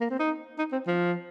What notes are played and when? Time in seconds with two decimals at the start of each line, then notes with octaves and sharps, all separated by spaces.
0.01 A#3
0.10 C4
0.19 D#4
0.59 D#4
0.72 C4
0.87 F3